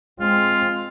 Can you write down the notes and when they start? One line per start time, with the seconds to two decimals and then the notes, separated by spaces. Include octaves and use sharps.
0.20 G#3 C4 F4